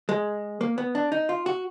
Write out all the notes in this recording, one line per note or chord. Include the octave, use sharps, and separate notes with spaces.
G#3
A#3
B3
D4
D#4
F4
F#4